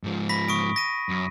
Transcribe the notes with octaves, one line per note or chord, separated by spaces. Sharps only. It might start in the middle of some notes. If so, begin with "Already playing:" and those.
G#2 F3
B5 A#6 B6
C#6 D#6 D7
A#6 D#7
F#2